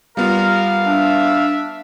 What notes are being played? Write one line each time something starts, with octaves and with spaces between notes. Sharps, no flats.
G3 B3 F4 A#4 F5
D4 E5